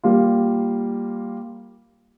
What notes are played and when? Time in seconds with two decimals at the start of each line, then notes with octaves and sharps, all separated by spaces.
0.04 G3 A#3 F4